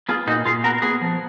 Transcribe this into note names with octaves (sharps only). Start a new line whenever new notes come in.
B3 F4 G#4
A#2 D#4 F#4
A#2 F4 G#4
B3 F#4 A#4
B3 G#4 B4
F3